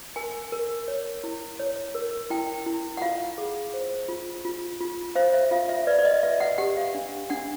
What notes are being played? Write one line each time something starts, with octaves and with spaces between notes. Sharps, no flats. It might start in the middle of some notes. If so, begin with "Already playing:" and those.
A#4 G#5
A#4
C#5
E4
C#5
A#4
E4 G5
E4
F#5
F4 F5
G#4
C5
F4
F4
F4
C5 F5
E5
F4 F5
E5
B4 D5
D5
D#5
B4 E5
F#5
G4 F#5
F5
D4
D4 F#5